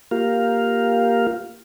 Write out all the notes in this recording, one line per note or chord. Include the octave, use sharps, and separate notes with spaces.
A#3 F4 G4 A#4 F5